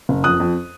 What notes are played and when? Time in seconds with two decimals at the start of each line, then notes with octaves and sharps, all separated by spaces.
0.09 F#1
0.24 F2 D#6 F#6
0.40 F2